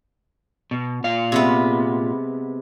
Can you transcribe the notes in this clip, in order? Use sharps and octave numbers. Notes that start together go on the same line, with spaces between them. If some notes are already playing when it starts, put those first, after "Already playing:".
B2
A#2 F5
C3 G#3 B3